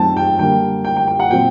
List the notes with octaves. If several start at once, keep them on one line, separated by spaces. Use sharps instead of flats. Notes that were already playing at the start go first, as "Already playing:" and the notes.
Already playing: F#2 D#3 A3 C4 G5 A5
G5
D3 G3 A#3 G5
G5
G5
G5
F#5
A#2 F#3 C4 G5